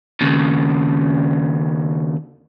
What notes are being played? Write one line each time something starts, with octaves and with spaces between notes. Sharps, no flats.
D#2 C#3